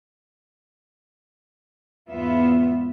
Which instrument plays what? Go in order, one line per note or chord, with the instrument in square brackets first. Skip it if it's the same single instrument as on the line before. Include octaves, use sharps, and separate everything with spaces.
[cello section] E2 G#2 B3 F4 E5